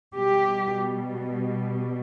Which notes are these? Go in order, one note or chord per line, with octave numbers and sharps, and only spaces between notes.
B2 G3 G4